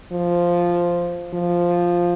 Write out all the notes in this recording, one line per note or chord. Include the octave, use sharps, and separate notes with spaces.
F3
F3